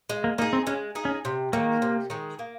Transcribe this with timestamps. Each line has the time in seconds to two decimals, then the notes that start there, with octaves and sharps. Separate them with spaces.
0.09 G#3
0.24 A#3
0.38 A#3 D#4
0.42 G#4
0.53 C4
0.67 G#3 C#4
0.95 D#4 G#4
1.05 C#4
1.25 C3
1.53 D#3 G#3 A#3
1.82 C3
2.10 D#3 G#3
2.39 A#3